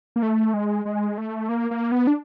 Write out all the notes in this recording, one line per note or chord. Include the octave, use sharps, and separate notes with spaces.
A#3
A3
G#3
G#3
A3
A#3
A#3
B3
D4